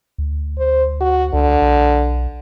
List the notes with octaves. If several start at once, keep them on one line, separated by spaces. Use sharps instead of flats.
D2
C5
F#4
C#2 D3
B1